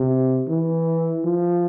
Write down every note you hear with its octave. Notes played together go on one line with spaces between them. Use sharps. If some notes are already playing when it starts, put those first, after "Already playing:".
Already playing: C3
E3
F3